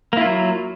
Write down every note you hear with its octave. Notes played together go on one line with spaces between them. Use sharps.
F#3 A#3 E4 F4